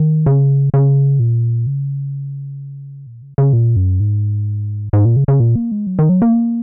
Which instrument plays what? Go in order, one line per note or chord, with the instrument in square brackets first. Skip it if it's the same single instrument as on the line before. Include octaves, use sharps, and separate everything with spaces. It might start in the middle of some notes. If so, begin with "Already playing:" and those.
Already playing: [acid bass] D#3
C#3
C#3
A#2
C#3
A#2
C#3
C#3
A#2
F#2
G#2
G#2
A#2
C#3
C#3
A#2
A#3
G#3
F#3
D#3
F#3
A#3